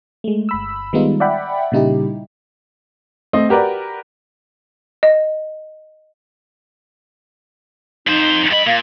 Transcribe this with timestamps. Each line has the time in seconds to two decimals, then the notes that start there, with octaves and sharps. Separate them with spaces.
0.24 G#3 A3
0.49 G1 B5 E6
0.93 D#3 G3 G#3 B3 D#4 F4
1.20 D5 E5 F#5 G5 B5
1.72 A#2 C#3 G3 D#4 E4 G4
3.33 A3 C4 D#5
3.49 F#4 G4 A#4 B4 D5
5.03 D#5
8.07 F2 D#4 C5
8.51 G2 D#5 B5
8.66 A#2 F5